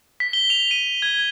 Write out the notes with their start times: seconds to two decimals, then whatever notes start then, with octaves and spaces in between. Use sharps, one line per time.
0.20 B6
0.33 G7
0.50 F7
0.71 D#7
1.02 G#6